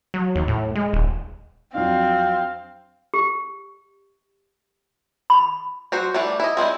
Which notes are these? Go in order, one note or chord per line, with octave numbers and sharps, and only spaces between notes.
F#3
D#2
A2
G#3
D#1
F2 F#3 C4 D4 F5
G4
B5
F#3 F#4 C5
E3 G3 A3 D4
E4 D#5
G#3 C4 D4 E4